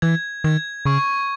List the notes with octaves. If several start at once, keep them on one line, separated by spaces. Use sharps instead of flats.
E3 G#6
D#3 G#6
C#3 C#6